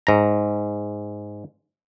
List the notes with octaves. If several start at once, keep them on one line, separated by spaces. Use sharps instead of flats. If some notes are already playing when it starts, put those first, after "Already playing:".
G#2 A#5